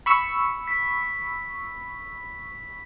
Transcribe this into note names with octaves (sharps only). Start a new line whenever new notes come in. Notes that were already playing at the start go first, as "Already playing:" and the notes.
B5 C#6 E6
B6